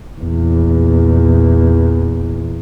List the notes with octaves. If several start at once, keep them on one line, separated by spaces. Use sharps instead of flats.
A#1 E2